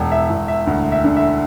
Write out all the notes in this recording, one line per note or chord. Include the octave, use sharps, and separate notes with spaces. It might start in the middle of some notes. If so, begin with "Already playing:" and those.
Already playing: E1
E5
E1
E5
D2
E5
D3
E5